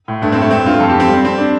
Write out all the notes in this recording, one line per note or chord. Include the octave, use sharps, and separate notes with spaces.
A2
G2 A3
G2 C4
A3
G2 C4
G2 F4
F2 A4
G4
F3 C4
G3
G3 C4
D4